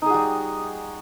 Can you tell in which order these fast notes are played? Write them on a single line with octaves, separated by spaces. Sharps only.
D#4 G#4 F#4 G3